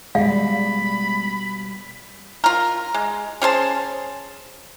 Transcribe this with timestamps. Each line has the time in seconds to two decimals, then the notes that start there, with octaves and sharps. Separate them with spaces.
0.15 B2 G3 G#3 F5 B5
2.44 F4 A#4
2.94 G#3
3.42 C#4 G#4 C5 A5